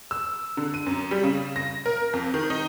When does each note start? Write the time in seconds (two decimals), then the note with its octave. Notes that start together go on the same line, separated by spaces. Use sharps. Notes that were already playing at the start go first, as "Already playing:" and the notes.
0.11 E6
0.57 D3
0.74 D#7
0.86 F#2
1.11 G3
1.24 C#3
1.56 A#6
1.86 A#4
2.13 F2
2.34 D#3
2.50 D#4